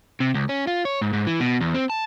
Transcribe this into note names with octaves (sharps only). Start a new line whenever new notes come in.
C3
C#2
C#4
F4
C#5
G#2
G#2
E3
B2
E2
C4
A5